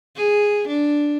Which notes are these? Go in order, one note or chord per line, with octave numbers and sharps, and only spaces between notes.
G#4
D4